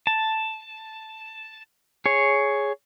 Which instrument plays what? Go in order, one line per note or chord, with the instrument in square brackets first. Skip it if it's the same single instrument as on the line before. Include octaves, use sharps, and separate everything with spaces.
[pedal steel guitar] A5
G#4 C#5